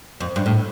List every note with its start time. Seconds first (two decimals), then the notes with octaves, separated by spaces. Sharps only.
0.20 F2
0.36 G2
0.46 A2